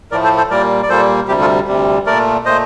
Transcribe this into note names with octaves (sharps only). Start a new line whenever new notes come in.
A2 F3 A3 A#4 D5
A4 C5
A4 C5
A#2 G3 A#3 A#4 D5
D5
A#2 G3 A#3 A4 C5
D2 C3 G3 G4
F4 A4
D2 C3 G3
A#2 A3 A#4 D5
A#2 A3 C5 D#5